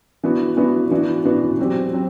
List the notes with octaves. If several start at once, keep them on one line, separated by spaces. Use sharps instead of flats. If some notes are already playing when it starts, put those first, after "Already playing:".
E3 B3 D4 F#4
E3 B3 D4 F#4
E3 B3 D4 F#4
E3 B3 D4 F#4
F#3 C4 G4
F#3 C4